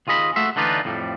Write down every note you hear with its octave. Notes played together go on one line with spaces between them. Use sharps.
D#2 F4 G#4 D#5 B5
A3 F#4 E5 C6
D3 E3 D4 D#4 F4 B4
F2 A2 F3 G3